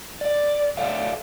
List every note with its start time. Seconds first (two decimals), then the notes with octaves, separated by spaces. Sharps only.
0.21 D5
0.77 A4 C#5 D5 E5 F5